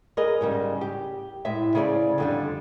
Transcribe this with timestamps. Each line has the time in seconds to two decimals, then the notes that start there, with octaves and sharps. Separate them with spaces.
0.17 G#4 A#4 B4 D#5
0.41 G#2 C#3 G3
0.81 G4
1.45 A2 G#3 E5
1.75 C#3 A3 G#4 C5 D5
2.18 F2 D3 G3